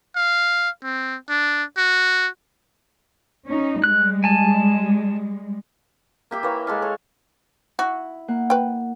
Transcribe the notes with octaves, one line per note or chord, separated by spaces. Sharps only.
F5
C4
D4
F#4
C#4 D#4
G3 G#3 F#6
G#5 A5
A#3 G4 E5
E3 A#3 C#5
G#3 A4 F5
A4 C#5
E4 F#4
A#3 F#5
B4 G5